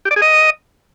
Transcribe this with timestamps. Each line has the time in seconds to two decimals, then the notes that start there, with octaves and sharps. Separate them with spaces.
0.05 G4
0.11 D5
0.16 G#4
0.22 D#5